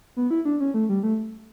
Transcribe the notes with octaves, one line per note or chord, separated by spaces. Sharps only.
B3
E4
D4
C#4
A3
G3
A3